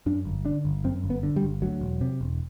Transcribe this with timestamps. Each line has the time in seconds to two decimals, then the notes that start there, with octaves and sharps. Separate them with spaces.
0.06 F#2 D4
0.25 G1
0.45 D3 D4
0.65 G1
0.84 F#2 C4
1.04 G1
1.10 B3
1.23 D3
1.36 G3
1.43 G1
1.62 D2 F#3
1.81 E1
2.01 C3
2.21 E1